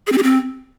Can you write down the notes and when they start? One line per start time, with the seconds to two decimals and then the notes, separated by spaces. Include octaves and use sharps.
0.07 G#4
0.12 C4
0.18 G4
0.23 C4